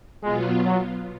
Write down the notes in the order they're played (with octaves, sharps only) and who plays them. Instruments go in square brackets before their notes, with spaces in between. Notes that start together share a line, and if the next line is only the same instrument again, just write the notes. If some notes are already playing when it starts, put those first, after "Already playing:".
[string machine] B2 F#3 B3 F4 [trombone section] G#3
[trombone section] F#3